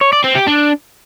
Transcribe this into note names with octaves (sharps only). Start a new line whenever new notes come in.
C#5
D5
C4
G4
D4